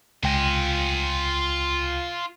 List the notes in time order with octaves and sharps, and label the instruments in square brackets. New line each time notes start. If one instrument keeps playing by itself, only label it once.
[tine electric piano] C#2 G5 A#6 [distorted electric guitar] F4 G#5